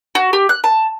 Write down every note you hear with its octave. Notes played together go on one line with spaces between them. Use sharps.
F#4
G4
F#6
A5